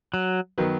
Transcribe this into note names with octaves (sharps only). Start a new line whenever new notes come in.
F#3
D#3 F#3 B3